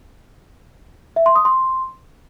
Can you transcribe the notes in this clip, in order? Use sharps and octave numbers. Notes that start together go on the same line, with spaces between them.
E5
C6
D#6
C6